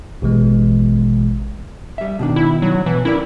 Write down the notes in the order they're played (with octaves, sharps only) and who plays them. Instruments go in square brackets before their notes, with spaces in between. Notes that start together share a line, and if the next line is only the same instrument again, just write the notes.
[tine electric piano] A1 B2 E3 G#3
[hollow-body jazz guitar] G3 E5
B2 D#3 D4
[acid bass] E4
F#3
[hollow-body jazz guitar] B2 [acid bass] E3
[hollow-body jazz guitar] C#4 A#4 D5 [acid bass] E4